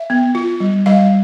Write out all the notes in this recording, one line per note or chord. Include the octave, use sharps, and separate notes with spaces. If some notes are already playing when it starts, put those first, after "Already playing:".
Already playing: E5
B3
F4
G3
G3 F5